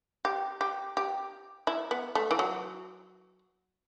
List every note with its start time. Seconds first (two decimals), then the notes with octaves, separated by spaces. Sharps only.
0.25 G4
0.61 G4
0.97 G4
1.67 E4
1.91 B3
2.15 A3
2.31 E3
2.39 F#3